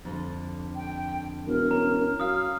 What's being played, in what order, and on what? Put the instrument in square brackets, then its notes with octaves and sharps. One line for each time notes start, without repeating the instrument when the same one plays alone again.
[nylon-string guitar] F2 D3
[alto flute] G5
[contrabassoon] E1 [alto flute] A#4
[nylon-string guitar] C#4 [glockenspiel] A#5
[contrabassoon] F#3 [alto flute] F5 [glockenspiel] D#6 F6